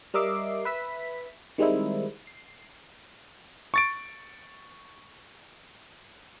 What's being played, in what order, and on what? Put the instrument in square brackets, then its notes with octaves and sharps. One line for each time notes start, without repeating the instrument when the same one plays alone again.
[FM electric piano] G3 A#4 D#5 E5 D6 C7
B4 E5 B6
D#3 G3 G#3 C4 D#4 E4
C7
[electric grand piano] C#6 A6 D7